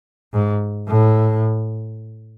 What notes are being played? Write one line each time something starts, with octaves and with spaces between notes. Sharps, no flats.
G#2
A2